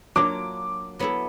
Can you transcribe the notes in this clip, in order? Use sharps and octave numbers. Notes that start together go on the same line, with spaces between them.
F#3 A#3 D4 F4 D6
F#3 B3 E4 A4